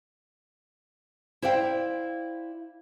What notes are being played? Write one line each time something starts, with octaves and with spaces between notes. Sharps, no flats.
E4 C5 D5 F5 G5